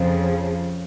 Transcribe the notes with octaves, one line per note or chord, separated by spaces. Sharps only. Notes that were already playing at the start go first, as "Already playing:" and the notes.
Already playing: F2 C#3 F3